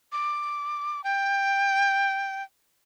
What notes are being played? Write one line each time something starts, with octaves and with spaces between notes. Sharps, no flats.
D6
G5